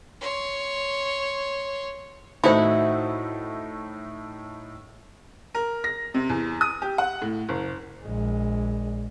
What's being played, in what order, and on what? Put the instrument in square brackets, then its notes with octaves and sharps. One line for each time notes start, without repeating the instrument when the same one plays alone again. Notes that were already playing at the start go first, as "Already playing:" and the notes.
[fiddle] C#5 C6
[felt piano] A2 A3 D#4 [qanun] E4 F#4 F#5 [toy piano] C5 B5
[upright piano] A#4
A#6
C3
E2
D#6
G4
F#5
A2
F#1
[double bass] A#1 G#3